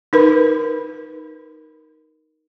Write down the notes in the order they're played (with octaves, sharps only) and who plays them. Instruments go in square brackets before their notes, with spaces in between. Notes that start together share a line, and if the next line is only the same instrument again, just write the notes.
[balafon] D#4 A#4 B4 B5